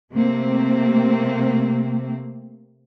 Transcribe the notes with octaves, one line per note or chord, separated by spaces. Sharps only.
C3 A3 A#3 C4